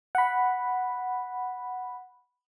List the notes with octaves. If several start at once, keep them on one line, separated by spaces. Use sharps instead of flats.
F#5 B5